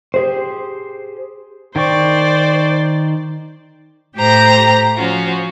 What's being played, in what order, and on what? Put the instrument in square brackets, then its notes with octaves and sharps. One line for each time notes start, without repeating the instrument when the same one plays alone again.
[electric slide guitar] G4 G#4 C5
[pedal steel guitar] D#3 G5 C#6 [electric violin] C5 D5
[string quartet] A2 G4 C5 A#5 A#6
F3 C#4 F4 F#4